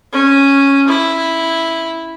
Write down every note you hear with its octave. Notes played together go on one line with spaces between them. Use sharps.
C#4
E4